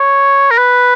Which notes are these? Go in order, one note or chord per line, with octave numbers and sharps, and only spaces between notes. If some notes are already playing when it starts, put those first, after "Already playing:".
Already playing: C#5
A#4
B4